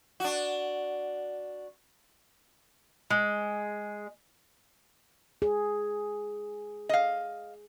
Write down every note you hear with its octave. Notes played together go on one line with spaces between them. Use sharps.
D4 F#4
G#3
G#4
D#5 F5